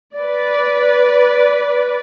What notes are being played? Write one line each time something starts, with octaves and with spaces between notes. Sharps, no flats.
B4 D5